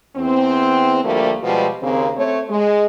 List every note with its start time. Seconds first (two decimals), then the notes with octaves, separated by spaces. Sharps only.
0.16 E2 C4
1.04 D2 F3 G3 A3 A#3
1.43 B2 F3 G3 G#3 B3
1.82 D#2 C#3 A#3 C4
2.17 A3 C4 C#5
2.49 G#3